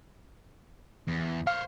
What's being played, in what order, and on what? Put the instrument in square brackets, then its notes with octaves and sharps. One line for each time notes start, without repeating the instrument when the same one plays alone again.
[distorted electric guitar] E2
[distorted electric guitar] C5 C#5 [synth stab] F5